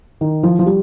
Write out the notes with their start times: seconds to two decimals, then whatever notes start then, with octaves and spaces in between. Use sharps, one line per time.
0.21 D#3
0.43 F3
0.59 F3
0.66 G3